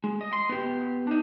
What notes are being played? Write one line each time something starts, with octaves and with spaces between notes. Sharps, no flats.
G#3
D#5
C6
B3 G4
D4 D#4